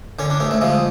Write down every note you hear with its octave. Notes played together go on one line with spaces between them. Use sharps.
D3 C#4
D4
D2 C#4
A3
F3 G#3